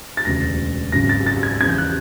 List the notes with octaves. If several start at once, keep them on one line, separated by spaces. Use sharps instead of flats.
A6
E1 D2 C#3 A#6
G#1 F#2 C#3 A#6
A6
A6
G#6
E2 C#3 F3 G#6
G6
F#6